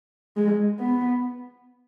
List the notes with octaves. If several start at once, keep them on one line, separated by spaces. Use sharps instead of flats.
G#3
B3